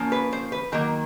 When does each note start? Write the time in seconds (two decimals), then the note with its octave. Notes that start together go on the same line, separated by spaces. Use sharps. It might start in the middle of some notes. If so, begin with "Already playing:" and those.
Already playing: F3 A#3 C#4
0.12 B4
0.33 C5
0.52 B4
0.72 D#3 F#3 A#3 A#4